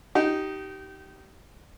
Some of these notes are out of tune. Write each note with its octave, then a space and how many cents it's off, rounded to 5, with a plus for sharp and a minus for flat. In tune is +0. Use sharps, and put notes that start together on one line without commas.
D#4 +0 G4 -25